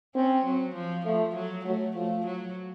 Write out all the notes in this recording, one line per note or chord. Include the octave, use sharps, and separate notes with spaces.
C4 C#4
F#3
F3
F3 A3
F#3
F#3 A3
F3 A3
F#3